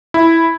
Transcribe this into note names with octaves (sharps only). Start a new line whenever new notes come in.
E4